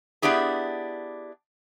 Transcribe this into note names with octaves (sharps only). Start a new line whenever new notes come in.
B3 D4 E4 G4 G#4